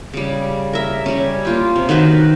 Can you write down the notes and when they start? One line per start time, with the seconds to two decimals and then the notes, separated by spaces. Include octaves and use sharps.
0.13 C#3 G3
0.73 A#4 E5
1.06 G3 C#4
1.45 A#3 F4 G4
1.76 C3
1.89 D#3 F#4 B4 C5